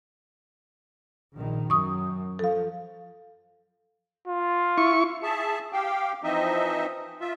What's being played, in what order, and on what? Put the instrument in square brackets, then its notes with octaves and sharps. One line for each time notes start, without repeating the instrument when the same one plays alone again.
[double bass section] A#1 D#3
[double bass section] F#2 [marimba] C#6 D#6
[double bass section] F3 [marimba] A4 F5
[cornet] F4
[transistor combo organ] E4 C#6
[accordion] G#4 E5 A5
G4 F5 G5
E3 F3 C4 D#4 D#5 E5
F4 E5